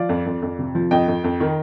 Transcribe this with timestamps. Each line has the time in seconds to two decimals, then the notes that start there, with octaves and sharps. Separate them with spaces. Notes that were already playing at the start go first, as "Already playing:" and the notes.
Already playing: F3 D5 F5
0.09 F2
0.26 F2
0.42 F2
0.59 C3
0.75 F3
0.91 F2 D#5 G5
1.08 F2
1.24 F2
1.40 D#3